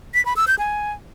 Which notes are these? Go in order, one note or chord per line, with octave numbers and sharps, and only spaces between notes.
B6
B5
E6
G6
G#5